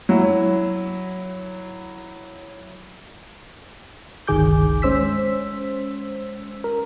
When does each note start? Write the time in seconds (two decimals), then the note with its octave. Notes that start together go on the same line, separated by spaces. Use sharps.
0.09 F#3 E4
4.27 G1 C#2 D#3 G#4 D6 G6
4.82 G#3 C#4 C5 E6 B6
6.64 A#4